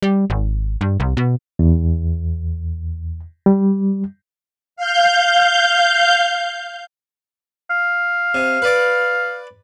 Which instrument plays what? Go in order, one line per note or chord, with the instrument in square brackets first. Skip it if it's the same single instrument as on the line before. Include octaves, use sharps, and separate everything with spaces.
[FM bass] G3
G#1
G2
C2
B2
[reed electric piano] E2
G3
[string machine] F5 G6
[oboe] F5
[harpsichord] C3
B4 D5